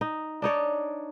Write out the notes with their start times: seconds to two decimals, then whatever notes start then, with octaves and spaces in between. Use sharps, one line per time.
0.01 D#4
0.42 D4 D#4 C#5 D5